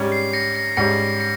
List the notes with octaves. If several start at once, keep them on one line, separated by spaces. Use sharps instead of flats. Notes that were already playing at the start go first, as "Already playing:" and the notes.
Already playing: G#2 G3 C#4
C7
A#6 C#7
A#6 C#7
G#2 G3 C#4 A#6 C#7
A#6 C#7